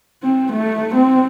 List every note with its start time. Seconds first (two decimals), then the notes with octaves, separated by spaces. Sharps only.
0.23 C4
0.52 A3
0.94 C4